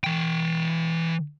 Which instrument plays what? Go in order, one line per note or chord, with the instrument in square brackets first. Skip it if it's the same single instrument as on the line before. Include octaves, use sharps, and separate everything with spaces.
[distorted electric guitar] E3 G5